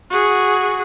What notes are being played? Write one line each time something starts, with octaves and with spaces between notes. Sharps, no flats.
F#4 G#4